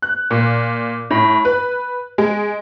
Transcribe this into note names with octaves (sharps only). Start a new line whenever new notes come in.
F#6
A#2
A2
B4
G#3